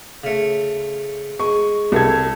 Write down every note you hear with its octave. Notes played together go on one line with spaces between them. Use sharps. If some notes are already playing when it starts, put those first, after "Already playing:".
C#3 A3
G#3 C#6
C2 A4 G#6